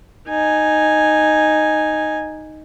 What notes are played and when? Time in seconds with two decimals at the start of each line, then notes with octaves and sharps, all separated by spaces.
0.28 D#4 G#5